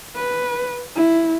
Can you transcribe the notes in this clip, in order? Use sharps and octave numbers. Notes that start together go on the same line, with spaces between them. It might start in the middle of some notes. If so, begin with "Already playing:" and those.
B4
E4